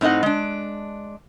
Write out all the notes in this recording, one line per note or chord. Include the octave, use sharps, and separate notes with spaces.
A2 C4 D#4 D#5 F#5
G#3 D4